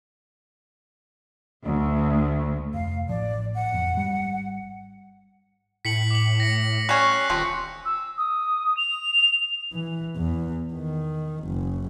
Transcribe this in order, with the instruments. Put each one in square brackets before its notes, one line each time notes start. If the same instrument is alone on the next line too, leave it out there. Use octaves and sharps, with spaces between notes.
[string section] D2
[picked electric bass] F1 [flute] F5
[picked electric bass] A1 F3 [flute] D5
[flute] F#5
[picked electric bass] G1 F2
G#1 G3
[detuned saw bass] A2 [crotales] B6 C#7 F#7
[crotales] D6 F#7
A#6 C#7
[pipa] G3 C#4 [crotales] F#6 C7
[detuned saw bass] D#1 [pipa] F3 C4
[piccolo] E6
D#6
F7
[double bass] E3
E2
D#3
F#1